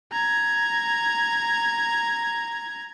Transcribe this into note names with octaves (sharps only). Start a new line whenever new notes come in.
A#5 G#6